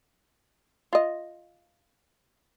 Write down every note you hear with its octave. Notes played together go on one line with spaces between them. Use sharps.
F4 D#5